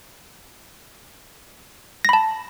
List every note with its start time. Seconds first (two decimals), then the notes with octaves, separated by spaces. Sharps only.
2.05 A#6
2.09 B5
2.13 A5